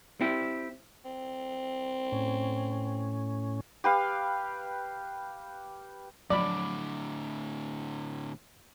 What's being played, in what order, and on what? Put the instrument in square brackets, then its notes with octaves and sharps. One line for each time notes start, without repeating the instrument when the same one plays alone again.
[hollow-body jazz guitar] C4 E4 G4
[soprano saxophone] C4
[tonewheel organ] A2 C#4
[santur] G4 B4 F5
[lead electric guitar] A2 D3 [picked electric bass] F3 F#3 [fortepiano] D5 B5 [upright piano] D6